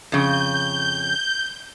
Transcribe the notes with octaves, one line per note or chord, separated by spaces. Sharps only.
F2 C#3 G6